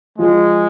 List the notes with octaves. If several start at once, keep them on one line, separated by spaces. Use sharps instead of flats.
F3 G#3